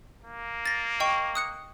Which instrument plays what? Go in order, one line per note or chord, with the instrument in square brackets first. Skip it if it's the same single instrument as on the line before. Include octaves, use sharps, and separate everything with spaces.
[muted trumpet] A#3
[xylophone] A6 A#6
D#5 G5 C#6
D#6 F#6 C#7